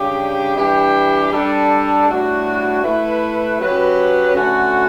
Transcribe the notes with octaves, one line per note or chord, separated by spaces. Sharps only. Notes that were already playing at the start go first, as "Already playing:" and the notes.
Already playing: C#3 G3 D4 G4
E3 G3 D4 G4
G3 D4 A4
A2 G3 D4 F#4
A3 E4 B4
F#3 C#4 G4 B4
D3 A3 C#4 F#4